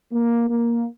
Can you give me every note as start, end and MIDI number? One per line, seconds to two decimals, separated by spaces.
0.13 0.48 58
0.49 0.86 58